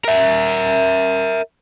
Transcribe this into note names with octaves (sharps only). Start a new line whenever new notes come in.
A#4 E5